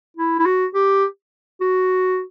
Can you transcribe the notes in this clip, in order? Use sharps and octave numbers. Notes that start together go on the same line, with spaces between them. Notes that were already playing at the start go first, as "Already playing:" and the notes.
E4
E4
F#4
G4
F#4